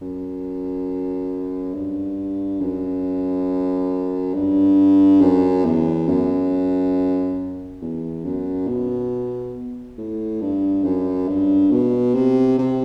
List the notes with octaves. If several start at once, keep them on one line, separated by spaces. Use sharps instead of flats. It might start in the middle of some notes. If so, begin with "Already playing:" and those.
F#2
G2
F#2
G2
F#2
E2
F#2
E2
F#2
B2
A2
G2
F#2
G2
B2
C3
C3